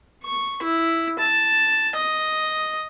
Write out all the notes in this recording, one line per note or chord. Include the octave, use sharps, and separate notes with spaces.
C#6
E4
A5
D#5